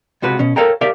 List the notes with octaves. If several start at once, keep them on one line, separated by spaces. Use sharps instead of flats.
C#2 C3 F#4 B4
B2 C#4
A4 A#4 C#5 F5 G5 A#5
G4 A#4 D5 E5 F5